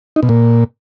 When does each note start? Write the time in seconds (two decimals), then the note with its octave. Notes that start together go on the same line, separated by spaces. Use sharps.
0.16 D#4
0.23 B2
0.29 A#2